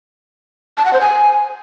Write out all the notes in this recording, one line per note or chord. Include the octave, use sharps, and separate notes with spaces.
A5
F#5
C5
G#5